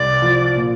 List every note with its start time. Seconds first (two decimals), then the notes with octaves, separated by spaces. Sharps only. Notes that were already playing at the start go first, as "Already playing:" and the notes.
Already playing: C2 D5
0.22 F3
0.55 A#2